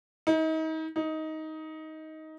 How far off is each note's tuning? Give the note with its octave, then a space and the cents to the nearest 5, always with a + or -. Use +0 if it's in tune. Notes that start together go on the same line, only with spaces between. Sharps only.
D#4 +35
D#4 +15